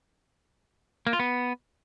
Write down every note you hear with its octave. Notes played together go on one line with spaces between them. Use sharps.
A#3
F4
B3